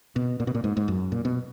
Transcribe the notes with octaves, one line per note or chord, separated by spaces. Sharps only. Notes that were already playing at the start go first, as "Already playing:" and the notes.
B2
A#2
B2
A#2
G#2
G#2
F#2
A#2
B2